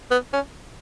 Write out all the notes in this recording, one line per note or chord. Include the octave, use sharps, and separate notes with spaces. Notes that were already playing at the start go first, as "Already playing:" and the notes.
B3
C#4